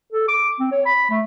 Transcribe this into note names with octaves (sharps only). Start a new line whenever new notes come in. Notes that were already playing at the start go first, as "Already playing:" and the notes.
A4
D6
C4
C#5
B5
A3